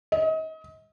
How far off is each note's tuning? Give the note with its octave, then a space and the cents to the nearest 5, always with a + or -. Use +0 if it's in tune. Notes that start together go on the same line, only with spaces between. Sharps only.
D#5 +35